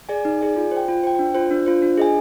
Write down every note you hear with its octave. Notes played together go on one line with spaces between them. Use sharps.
G#4 D5 G#5
D#4
G#4 D5 G#5
F4
C5
G5
F4
C5 G5
D4
F4 C5
D4
F4 C5
D4
G#4 D#5 G#5